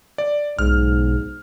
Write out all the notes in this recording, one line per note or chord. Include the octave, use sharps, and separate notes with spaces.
D5
B1 G#2 F6